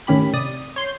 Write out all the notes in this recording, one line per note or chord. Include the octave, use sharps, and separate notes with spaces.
A2 D#3 C#4 G4 B5
C3 D5 D#6 D#7
C#5 C6 G6